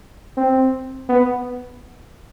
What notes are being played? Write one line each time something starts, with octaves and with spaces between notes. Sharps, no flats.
C4
B3